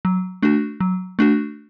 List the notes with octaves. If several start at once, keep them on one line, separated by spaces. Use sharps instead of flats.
F#3
A3 D4 F#4
F#3
A3 D4 F#4